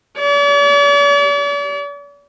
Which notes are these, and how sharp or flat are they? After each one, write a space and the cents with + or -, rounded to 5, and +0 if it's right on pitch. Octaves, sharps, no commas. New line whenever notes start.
D5 -45